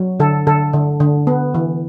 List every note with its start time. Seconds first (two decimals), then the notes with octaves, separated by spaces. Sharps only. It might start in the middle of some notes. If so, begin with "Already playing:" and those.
Already playing: F#3
0.20 D3 A4
0.47 D3 A4
0.73 D3
1.00 D3
1.27 B3
1.54 E3